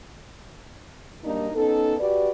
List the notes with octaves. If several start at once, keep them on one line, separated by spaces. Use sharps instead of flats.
F#2 G3 A#3 D4 D#4
B3 C#4 D#4 A4
F#4 G4 B4 D5